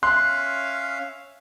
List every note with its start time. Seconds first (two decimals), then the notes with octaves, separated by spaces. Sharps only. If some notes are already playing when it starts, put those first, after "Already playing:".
0.03 C#4 E5 F5 C6 F#6